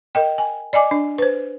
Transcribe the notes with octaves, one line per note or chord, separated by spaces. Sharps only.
A#4 D#5 G5
G#5
D5 D#5 G#5 D6
D4
B4 C5